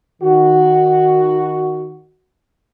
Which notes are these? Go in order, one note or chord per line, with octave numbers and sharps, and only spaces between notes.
D#3 F#4